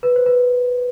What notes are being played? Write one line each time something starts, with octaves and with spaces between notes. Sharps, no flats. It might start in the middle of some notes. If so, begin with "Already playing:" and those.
B4
C5
B4